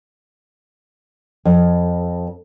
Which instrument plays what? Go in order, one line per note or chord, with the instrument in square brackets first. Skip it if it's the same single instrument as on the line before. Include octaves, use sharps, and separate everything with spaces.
[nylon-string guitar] F2